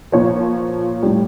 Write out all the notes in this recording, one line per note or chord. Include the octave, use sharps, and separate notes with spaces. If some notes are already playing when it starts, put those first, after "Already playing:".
A#2 F3 C#5
A2 G3